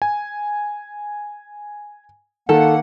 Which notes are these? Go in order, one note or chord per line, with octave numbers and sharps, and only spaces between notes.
G#5
D#3 A#3 A4 F#5